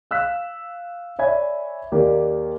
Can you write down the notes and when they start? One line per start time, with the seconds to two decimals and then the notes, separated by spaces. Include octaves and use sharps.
0.11 F5 E6 F#6 B6
1.19 C#5 D5 E5 G#5 B5 G#6
1.92 D#2 A#3 G4 D5